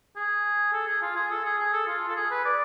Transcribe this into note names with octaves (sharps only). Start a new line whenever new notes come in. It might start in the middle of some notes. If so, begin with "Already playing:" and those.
G#4
A4
G#4
F4
G#4
A4
G#4
G#4
A4
F4
A4
G#4
B4
D5